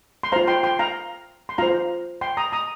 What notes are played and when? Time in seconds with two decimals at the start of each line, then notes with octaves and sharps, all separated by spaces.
0.23 C6
0.32 F4 C5 F5 A#5
0.48 G5 C6
0.63 G5 C6
0.79 F5 A#5
1.49 C6
1.58 F4 C5 F5 A#5
2.21 G5 C6
2.37 A#5 D#6
2.52 A#5 D#6